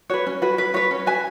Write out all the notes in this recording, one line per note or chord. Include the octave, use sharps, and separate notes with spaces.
F#4 B4 C#5
C#4
F#4 B4
C#4 B4
F#4 B4 C#5
C#4
F#4 B4 G#5